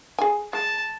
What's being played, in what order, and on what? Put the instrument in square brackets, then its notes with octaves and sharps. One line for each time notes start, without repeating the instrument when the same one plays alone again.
[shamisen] G#4 G#5
[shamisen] G#3 [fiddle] A5